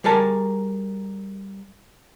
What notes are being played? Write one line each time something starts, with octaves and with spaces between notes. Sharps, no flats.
G3 G#4 A#4 A5